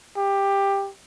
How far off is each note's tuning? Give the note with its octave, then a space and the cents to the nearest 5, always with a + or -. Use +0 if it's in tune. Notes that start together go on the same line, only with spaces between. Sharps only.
G4 +15